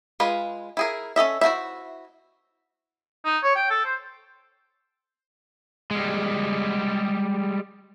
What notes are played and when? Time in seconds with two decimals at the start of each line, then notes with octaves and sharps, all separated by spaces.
0.20 G#3 F4 G#4 B4
0.77 E4 G#4 A#4
1.16 C#4 A4 D#5 E5
1.41 E4 F#4 A4 C5 E5
3.25 D#4
3.44 C#5
3.55 G5
3.70 A4
3.85 C5
5.91 G3 G#3